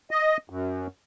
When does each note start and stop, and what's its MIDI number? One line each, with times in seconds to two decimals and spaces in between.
0.11 0.37 75
0.50 0.87 42